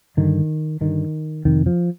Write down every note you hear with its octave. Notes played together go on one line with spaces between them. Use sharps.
G2 D3 D#3
G2 D3 D#3
F2 C3 D#3
F3